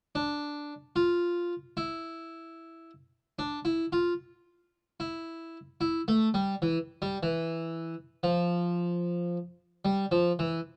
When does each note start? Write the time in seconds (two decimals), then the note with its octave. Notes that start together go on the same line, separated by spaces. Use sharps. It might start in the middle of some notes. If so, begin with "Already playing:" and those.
0.15 D4
0.96 F4
1.77 E4
3.39 D4
3.65 E4
3.92 F4
5.00 E4
5.81 E4
6.08 A3
6.34 G3
6.62 E3
7.02 G3
7.23 E3
8.23 F3
9.85 G3
10.11 F3
10.39 E3